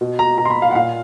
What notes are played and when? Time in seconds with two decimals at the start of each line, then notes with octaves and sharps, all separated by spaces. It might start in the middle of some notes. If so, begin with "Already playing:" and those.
0.01 B2
0.19 A#5
0.38 B2 A#5
0.45 C6
0.50 B5
0.62 F5
0.71 F#5
0.75 A#2 F5